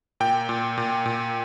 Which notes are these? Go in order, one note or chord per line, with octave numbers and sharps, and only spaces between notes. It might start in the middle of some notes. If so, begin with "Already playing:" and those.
A#2 G5
A#2
A#2
A#2